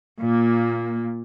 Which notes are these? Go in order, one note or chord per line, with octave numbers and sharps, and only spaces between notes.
A#2 A#3